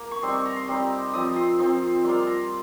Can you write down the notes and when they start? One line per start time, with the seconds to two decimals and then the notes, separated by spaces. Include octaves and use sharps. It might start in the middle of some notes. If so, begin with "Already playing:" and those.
Already playing: A#3
0.11 C#6
0.22 G3 C4 D#4 C6
0.34 C#6
0.46 A#5
0.56 C6
0.68 G3 C4 D#4
1.13 F3 C4 D#4 D#6
1.36 C6
1.59 F3 C4 D#4 C6
2.04 G3 A#3 F4 C6
2.27 A#5